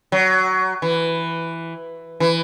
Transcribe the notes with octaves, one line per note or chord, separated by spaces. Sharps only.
F#3
E3
E3